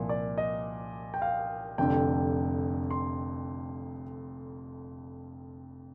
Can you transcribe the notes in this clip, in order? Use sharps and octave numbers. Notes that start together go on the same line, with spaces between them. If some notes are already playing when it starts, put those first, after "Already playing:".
Already playing: C2 A#2 F3
D5
D#5
G5
F5
F1 F2 D3 G5
C6